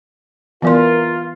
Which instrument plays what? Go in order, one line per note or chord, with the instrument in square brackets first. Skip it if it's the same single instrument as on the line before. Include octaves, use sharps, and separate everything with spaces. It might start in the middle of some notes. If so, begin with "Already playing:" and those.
[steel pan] E3 G3 [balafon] B3 D5 C6 [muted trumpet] F4 [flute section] A#4